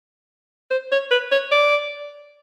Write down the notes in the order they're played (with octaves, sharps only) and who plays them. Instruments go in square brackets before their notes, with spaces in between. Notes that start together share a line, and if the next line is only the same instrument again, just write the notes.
[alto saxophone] C5
C#5
B4
C#5
D5